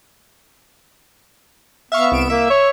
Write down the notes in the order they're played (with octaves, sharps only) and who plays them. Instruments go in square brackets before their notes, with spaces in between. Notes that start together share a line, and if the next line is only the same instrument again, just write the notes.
[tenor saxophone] B3 [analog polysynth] E5 F5 C#6
[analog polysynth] C2 D7 E7
[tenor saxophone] A#3 [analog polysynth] E5
[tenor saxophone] C#5